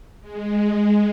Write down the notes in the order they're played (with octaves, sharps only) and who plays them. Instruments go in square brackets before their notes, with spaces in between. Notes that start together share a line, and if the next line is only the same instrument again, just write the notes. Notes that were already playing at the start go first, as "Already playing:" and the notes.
[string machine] G#3